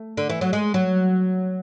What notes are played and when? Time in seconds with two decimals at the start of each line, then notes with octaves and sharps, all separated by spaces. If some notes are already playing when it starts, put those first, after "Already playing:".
Already playing: A3
0.17 D3
0.30 E3
0.41 F#3
0.53 G#3
0.74 F#3